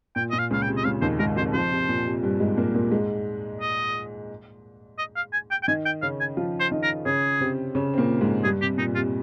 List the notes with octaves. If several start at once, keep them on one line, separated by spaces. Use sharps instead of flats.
A#2 G5
A#2 D#5
F5
C#2 C#3 F5
G5
C3
D#5
C#2 C#3 F5
D#2 D#3 C5
G#2 G#3 A#4
F2 F3 C5
F2 F3 C5
C3
A#2
C3
G2 G3
G#2 G#3
A#2 A#3
A#2 A#3
G#2 G#3
D#5
D#5
F5
G#5
G5
G5
D#3 D#4 G#5
G5
C#3 C#4 F5
G#5
F3 F4
C5
D#3 D#4
A#4
C#3 C#4 G#4
C3 C4
C#3 C#4
C4
A#2 A#3
G#2 G#3
G2 G3 G#4
C3 G4
A#2 D#4
C3 F4